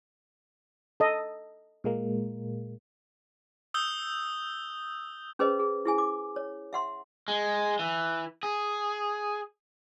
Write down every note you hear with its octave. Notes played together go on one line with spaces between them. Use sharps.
A4 D#5
A#2 G#3 A#3
D#6 E6 G6 G7
C#4 G#4 B4 C5 D#5
G#4
E4 G#4 G#5
D6
C#5
E5 F#5 C6
G#3
E3
G#4